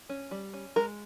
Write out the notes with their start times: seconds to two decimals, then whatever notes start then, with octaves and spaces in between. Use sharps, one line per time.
0.09 C#4
0.31 G3
0.53 C#4
0.76 G#3 A#4